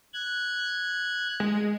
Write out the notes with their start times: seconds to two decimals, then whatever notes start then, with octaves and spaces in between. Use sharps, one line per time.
0.13 F#6 G#6
1.40 G#3